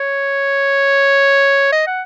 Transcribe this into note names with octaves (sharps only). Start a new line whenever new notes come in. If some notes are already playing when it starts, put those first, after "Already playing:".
Already playing: C#5
D#5
F#5